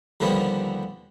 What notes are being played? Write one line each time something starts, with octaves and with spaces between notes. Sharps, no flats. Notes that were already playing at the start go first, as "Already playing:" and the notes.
D#2 D3 F3 G3 B3